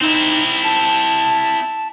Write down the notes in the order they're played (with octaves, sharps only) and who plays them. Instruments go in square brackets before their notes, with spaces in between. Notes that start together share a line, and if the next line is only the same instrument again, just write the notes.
[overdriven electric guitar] C4 E4 [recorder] D#4
[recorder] A5